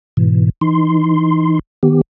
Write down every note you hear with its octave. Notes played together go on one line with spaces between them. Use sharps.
G#2 B2 E3
E3 D#4 C6
D#3 B3 G4